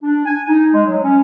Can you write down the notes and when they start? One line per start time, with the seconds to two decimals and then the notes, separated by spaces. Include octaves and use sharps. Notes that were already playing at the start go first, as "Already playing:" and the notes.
0.03 D4
0.26 G#5
0.49 D#4
0.74 G#3
0.86 F#3
1.03 C#4